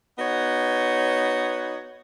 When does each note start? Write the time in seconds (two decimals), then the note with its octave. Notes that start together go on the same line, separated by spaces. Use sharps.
0.19 B3 D#4 F#4 C#5